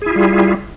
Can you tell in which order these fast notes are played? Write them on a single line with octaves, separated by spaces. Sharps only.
G#4 E4 F4 G3